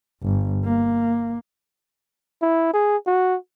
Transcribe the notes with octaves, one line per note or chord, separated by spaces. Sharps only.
G1
A#3
E4
G#4
F#4